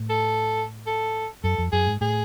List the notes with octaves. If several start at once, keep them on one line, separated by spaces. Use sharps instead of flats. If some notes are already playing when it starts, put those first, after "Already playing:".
Already playing: A2
A4
A4
F#2 A4
F2
F#2 G#4
G#2
A2 G#4